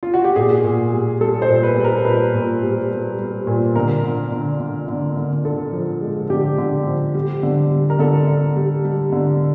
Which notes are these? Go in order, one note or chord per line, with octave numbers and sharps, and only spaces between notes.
F4
F#4
G4
A#2 G#4
A#2
G3
G3 A4
C5
A#2
B4
G3
A#4
A#2 B4
A#2
G3
G3
G3
A#2
D3 A#4
D3
D3
D3
D3
D3
D3 A4
F3
G#3
D3 G4
D3
F3
G3
D3
G3
A#4
D3 A4
D3
G3
G3
D3